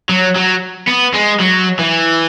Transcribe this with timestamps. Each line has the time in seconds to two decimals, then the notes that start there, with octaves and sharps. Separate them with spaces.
0.09 F#3
0.36 F#3
0.87 B3
1.14 G#3
1.40 F#3
1.79 E3